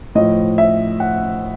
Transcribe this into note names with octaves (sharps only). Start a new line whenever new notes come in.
A2 F3 D#5
E5
F#5